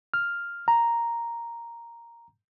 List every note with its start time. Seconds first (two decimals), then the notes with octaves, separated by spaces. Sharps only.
0.14 F6
0.68 A#5